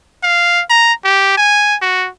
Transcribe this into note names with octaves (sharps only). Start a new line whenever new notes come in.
F5
A#5
G4
G#5
F#4